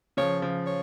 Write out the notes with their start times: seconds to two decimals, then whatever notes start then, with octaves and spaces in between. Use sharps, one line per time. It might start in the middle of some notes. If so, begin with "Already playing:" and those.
0.17 C#3 F3 C#5
0.42 C#3 F3
0.66 C#5